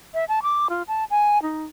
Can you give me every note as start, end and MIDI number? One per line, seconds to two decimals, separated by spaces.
0.14 0.25 76
0.29 0.40 81
0.43 0.68 86
0.70 0.83 65
0.88 1.04 81
1.10 1.41 80
1.42 1.64 63